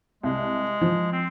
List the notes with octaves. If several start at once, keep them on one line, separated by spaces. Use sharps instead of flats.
C2 G#3
F3
C4